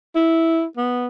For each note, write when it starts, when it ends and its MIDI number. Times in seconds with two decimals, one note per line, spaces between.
0.16 0.65 64
0.77 1.07 59